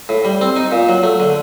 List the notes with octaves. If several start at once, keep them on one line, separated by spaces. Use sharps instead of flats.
A2
G3
C4
D#4
A#2
F#3
A3
D3